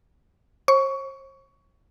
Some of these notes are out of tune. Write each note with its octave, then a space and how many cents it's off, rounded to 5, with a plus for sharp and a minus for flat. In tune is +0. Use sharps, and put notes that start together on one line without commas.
C5 +45 C#6 +20